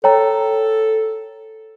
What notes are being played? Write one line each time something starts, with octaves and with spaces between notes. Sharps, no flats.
A4 C#5 G5 A#5